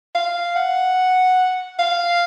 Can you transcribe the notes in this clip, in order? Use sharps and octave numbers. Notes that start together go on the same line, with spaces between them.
F5
F#5
F5